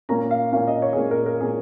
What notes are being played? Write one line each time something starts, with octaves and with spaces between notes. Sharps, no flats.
A#2 A#3 C#4 A#5
F5
A#2 A#3 C#4 F5
D#5
C#5
G#4
A#2 A#3 C#4 A#4
A#4
A#4
A#2 A#3 C#4 G#4